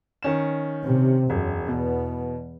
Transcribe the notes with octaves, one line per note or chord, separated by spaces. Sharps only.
D#3 C#4 E7
C3
E1 F#2
E2 B2 B3